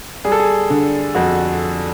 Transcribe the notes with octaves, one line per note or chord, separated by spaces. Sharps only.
G3 G#4
A4
G#4
D3
F2 F#4